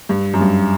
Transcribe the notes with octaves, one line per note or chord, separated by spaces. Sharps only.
G2
F#2
G2